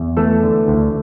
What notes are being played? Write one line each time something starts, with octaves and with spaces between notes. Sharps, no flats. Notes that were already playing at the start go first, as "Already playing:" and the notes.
Already playing: E2
E3 A3 A4
D3
D2